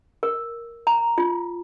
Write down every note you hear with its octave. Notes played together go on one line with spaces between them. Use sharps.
A#4
A#5
F4